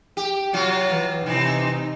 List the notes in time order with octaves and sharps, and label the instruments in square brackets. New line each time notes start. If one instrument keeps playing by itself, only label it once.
[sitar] G4
C3 F#3 F4
[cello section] E3
[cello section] C3 D#4 [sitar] E3 C4